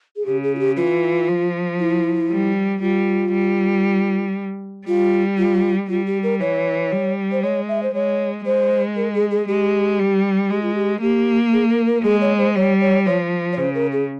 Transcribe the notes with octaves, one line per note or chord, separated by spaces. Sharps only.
G#4
C#3 G4
G#4
F4
G4
E3 F4
F3
E4
G3
G3 F4
G3
G3 F4
F4
G3 F4
G4
A#4
E3 C#5
G3
C5
G#3 C#5
E5
C5
G#3 C#5
G#3 C5
A#4
G#4
G#4
G#3 G4
G3
G#3 G4
F4
G4
A#3 G4
G#4
A#4
A#4
G#3 G#4
C#5
C5
G3 C#5
C#5
F3 C#5
C#5
C#3 C5
A#4
G#4